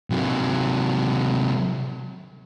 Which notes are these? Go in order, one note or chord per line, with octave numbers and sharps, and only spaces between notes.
C3 F#3